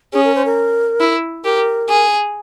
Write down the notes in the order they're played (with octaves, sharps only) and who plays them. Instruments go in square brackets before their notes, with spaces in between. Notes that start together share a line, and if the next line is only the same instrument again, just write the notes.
[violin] C#4 [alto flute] G#4
[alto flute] A#4
C5
A#4
[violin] E4
[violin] G4 [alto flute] A#4
[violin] G#4